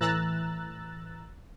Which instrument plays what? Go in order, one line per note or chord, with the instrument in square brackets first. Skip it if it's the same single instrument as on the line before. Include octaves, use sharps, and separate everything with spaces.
[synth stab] A2 E3 A#5 E6 F#6 A6